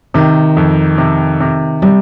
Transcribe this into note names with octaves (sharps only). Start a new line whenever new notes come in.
C3 D#3
F2
C3
C3
C3 G3